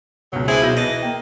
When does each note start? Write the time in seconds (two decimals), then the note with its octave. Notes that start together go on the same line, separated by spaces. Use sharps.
0.33 C#2 B2 F#3
0.48 C4 D4 E4 G#4 B4
0.62 B1 E6 G6 A#6
0.77 E3 D#5 A5
0.89 A#6
1.02 A#3 G5